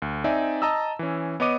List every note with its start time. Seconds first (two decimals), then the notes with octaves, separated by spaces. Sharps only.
0.02 D2
0.24 C4 D#4 D5 E5 G#5
0.62 D#5 A5 A#5 D#6 E6
0.99 E3 C#4
1.40 B3 C#5 D#5 D6 D#7